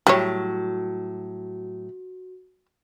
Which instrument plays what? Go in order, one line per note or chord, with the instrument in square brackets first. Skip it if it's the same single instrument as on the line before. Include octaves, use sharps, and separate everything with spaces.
[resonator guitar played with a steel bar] A2 F#3 [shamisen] G3 C#5 [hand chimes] F#4